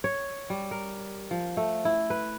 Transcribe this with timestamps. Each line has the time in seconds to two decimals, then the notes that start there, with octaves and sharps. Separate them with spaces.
0.04 C#5
0.50 G3
0.71 A#4
1.31 F3
1.57 A3
1.85 E4
2.10 B4